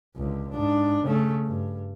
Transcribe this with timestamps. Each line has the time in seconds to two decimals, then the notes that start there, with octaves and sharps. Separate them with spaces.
0.16 C#2 D3
0.50 G#2 D4
1.03 C#3 A3
1.46 G2